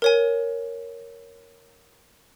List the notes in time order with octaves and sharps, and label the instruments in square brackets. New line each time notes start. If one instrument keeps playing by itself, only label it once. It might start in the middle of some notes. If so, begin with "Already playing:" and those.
[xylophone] A#4 C#5 G#5